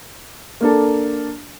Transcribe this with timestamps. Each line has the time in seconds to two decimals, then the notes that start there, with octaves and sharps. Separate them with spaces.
0.61 A#3 D4 A4